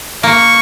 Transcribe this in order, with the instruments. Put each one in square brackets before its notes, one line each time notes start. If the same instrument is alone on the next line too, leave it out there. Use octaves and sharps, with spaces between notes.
[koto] A#3 [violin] C#6